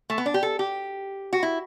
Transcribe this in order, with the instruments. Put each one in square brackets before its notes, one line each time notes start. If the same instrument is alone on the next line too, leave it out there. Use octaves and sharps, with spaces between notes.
[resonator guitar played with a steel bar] A3
B3
D4
G4
A4
G4
F#4
E4